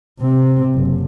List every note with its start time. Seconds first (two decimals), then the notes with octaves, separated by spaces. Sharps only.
0.21 C3 C4
0.75 F#1